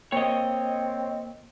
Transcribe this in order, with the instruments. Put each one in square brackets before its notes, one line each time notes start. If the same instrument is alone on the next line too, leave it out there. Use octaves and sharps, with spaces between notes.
[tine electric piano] A#3 [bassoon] C4 [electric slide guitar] C#5 D#5